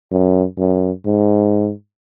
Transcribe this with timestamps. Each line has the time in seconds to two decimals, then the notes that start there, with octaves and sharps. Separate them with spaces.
0.11 F#2
0.58 F#2
1.05 G#2